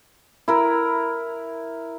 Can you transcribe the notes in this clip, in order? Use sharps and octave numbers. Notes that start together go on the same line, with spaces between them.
E4 A#4